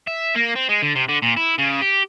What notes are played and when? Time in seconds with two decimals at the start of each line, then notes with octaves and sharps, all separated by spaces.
0.07 E5
0.35 A#3
0.55 C4
0.69 G#3
0.82 D3
0.95 C3
1.09 D3
1.22 A#2
1.37 E4
1.58 C#3
1.81 G4